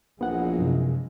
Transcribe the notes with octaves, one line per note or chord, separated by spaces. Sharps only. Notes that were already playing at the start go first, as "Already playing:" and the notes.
A#1 E3 F3 G#3 B3 F#5
F#2 C3